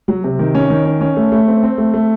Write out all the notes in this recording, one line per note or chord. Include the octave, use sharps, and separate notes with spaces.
F#3
C3
D#3
C#4
D#3
C#4
C#4
A3
A3
C4
C4
A3
A3